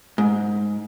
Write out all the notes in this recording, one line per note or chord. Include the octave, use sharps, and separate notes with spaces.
G#2